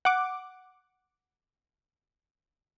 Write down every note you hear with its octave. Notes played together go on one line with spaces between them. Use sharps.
F#5 D6